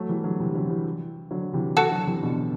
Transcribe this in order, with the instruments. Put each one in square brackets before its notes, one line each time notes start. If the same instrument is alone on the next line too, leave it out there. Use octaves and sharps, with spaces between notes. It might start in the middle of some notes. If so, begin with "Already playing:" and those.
Already playing: [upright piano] F#3 A3
E3 G3
D3 F#3
C3 E3
D3 F#3
E3 G3
D3 F#3
C3 E3
[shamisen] F#4 A4
[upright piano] D3 F#3
C3 E3
B2 D3